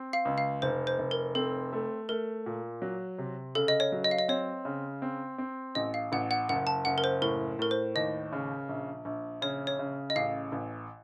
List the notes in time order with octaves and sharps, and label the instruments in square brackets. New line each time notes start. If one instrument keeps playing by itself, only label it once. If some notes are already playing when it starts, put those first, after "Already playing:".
Already playing: [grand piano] C4
[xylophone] F5
[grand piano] C#2
[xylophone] F5
[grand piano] F1 [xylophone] C5
[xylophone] C5
[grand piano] F1
[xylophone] A#4
[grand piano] C4 [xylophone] A4
[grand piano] A3
[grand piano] A3 [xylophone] A#4
[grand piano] A#2
F#3
C3
[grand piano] C#3 [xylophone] A4
[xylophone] D#5
C#5
[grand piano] F#3
[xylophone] D#5
F5
D#5
[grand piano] C4 [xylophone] C#5
[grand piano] C#3
C4
C4
[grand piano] A1 [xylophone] D#5
[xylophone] F5
[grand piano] A1 [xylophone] F#5
[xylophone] F#5
[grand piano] F#1 [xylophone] F#5
[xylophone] A5
[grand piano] F#1 [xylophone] F#5
[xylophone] A#4
C5
[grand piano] A2 [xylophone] A#4
[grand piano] A2 [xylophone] A#4
[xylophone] C5
[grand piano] D#2 [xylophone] D#5
[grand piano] C#3
A#1
A#1
[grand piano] C#3 [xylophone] C#5
[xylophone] C#5
[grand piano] C#3
[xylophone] D#5
[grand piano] A1 [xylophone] F5
[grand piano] A1